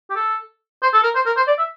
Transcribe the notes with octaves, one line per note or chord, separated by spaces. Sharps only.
G4
A4
C5
A4
A#4
C5
A#4
C5
D5
E5